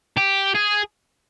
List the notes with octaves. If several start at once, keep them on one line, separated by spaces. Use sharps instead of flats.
G4
G#4